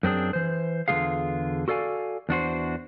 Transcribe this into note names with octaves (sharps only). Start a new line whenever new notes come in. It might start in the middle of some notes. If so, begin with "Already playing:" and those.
F#2 C4 D4 G#4
E3 C5
E2 D3 G3 F4 G#4 F5
F#4 A4 D5 F5 G#5
E2 D4 F#4 C5